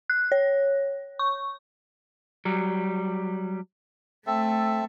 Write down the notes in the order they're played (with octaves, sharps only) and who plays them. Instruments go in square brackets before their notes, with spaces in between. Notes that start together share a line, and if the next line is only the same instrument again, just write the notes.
[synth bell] F#6
C#5
C#6
[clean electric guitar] F#3 G3
[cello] A3 [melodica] C4 A4 E5